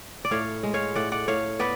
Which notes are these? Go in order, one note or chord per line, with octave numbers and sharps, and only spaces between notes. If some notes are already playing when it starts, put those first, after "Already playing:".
D5
A2 C#5 F5
G#3
C#5 F5
A2 D5 F#5
D5 F#5
A2 C#5 F5
B3 B4 D5